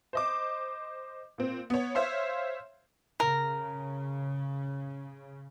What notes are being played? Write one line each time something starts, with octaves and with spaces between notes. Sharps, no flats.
C5 D#5 D6
A#2 C4
B3 C#5
C5 C#5 E5 F5 C6
C#3 A#4